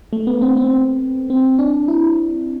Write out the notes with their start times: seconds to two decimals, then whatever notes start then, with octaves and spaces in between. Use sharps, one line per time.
0.13 A3
0.27 B3
0.42 C4
0.57 C4
1.30 C4
1.59 D4
1.88 E4